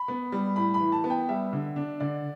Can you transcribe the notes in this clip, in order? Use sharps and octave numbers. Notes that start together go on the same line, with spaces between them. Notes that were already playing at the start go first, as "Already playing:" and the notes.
Already playing: B5
B3
G3
A2 B5
B5
E3
A5
B3
G5
G3 E5
D3
D4
D3 D5